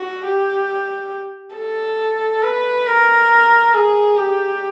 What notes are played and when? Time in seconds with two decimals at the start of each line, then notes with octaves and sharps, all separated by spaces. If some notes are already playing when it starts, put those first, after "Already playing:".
Already playing: F#4
0.24 G4
1.55 A4
2.43 B4
2.87 A#4
3.74 G#4
4.17 G4